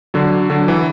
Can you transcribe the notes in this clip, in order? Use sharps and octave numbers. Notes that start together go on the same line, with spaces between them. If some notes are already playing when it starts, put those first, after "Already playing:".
D3 F#3
D3 F#3
E3